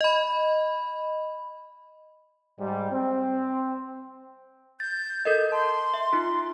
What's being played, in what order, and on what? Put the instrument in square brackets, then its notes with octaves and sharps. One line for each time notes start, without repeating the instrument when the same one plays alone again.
[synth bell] D#5 B5
[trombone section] G#2 G3
C4
[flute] G6 [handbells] A6
[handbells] A4 A#4 D#5
[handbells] A5 [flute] C6
[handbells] E5
D#4 F4